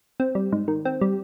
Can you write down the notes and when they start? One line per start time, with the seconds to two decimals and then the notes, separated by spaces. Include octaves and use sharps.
0.20 C4
0.35 G3
0.52 G#2
0.68 D#3
0.85 C4
1.01 G3